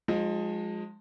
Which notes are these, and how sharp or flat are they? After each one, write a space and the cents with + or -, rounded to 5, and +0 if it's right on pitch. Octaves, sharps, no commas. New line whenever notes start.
F3 +35 G#3 +0 D#4 +0